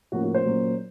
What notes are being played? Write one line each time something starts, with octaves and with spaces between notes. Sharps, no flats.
A2 F3 A#3 C#4 F#4
F#4
C5
A#2 F#3 A#3 C#4